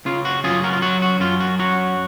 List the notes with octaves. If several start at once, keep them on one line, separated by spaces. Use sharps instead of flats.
C#3 F4
F#4
F#2 F4 G#4
F#4 A#4
F4
F#3 F#4
F#4
F#2 F4
F#4
F#3 F#4